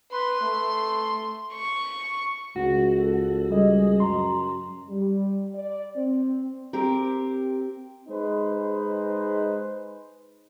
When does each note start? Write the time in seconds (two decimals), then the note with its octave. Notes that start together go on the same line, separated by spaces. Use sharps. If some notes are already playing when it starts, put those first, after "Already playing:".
0.12 B4 C6
0.41 A3
1.54 C#6
2.56 C#2 F#4
2.97 A4
3.51 G3 G#4 D#5
4.00 F#2 A#5 C6
4.88 G3
5.54 D5
5.96 C4
6.73 C4 G4 A#4
8.09 G#3 D#4 B4 C5